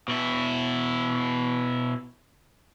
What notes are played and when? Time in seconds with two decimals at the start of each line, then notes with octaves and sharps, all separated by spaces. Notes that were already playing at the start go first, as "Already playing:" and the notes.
0.08 B2 E4